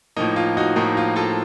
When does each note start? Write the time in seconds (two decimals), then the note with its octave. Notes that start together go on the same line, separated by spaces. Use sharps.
0.17 A2 F3 A#3 D#4
0.36 F4
0.57 D#4 F#4
0.76 A2 F3 A#3 D#4
0.97 F4
1.16 F4 A4